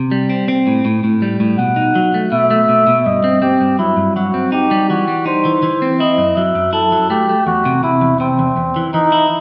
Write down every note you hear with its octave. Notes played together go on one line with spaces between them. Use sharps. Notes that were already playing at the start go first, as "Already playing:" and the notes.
Already playing: C3
G3
C4
C4
A2
A2
A2
G3
A2
B2 F#5
D#4
F#3
A3
B2 E5
A3
B2
B2
G2 D#5
C4
C4 G4
G2
F#3 E4
G2
F#3 F#4
C4
D#4 G4
G3
E3 F#4
G3
D#4 C5
E3
E3
C4
E4 D#5
F#2
F#3 E5
F#2
E4 A4
F#3
A3 G4
A3
E2 F#4
C3
C3 E4
E2
C3 C4
E2
E2
E3
E3 D#4
E4